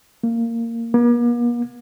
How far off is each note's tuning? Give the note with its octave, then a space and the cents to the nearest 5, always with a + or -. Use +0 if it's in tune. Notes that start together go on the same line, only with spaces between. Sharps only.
A#3 -15
A#3 +45